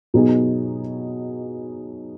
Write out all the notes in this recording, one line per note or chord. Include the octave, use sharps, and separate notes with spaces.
B2 F#3 B3 D#4 G#4